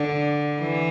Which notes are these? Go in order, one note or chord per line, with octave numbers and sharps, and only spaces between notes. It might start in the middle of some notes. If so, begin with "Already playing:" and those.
Already playing: D3
E3